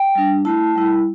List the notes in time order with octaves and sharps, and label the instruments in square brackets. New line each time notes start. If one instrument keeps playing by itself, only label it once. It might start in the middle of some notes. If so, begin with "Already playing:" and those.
Already playing: [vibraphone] G5
G3 D4
A3 E4 A5
G3 E4